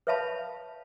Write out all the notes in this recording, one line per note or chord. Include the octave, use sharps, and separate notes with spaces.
B4 C#5 E5 F5 A5 B5